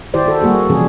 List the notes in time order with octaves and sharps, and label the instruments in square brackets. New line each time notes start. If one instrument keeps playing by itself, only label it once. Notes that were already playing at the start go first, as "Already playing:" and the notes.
[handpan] D#3 E4 G4 C5 D5
F#4 A4
G3 A#3 F#4 G#4
C3 E3 F3 C#4 G#4